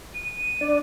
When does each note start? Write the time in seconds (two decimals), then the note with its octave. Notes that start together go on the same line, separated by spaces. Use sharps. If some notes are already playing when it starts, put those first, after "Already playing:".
0.14 D#7
0.61 D4 D5